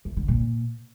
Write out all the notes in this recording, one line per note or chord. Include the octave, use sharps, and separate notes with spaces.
E3
D3
A#2